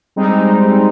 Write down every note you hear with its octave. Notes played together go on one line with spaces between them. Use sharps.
G3 G#3 C4 D#4